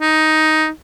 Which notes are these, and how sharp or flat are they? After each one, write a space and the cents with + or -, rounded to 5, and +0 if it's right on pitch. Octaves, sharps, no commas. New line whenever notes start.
D#4 +5